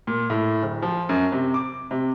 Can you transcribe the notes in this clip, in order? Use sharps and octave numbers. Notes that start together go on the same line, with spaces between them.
A#2
A2
D1
F3
F#2
C3
D6
C3